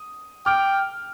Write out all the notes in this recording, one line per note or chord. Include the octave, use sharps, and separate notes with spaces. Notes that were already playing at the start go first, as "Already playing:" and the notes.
Already playing: D#6
G5 D6 F6